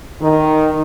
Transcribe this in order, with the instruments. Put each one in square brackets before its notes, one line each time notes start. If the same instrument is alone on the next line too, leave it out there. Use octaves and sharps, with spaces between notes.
[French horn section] D#3